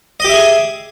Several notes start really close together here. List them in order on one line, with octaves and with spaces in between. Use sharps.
D#5 G4 E5 G#4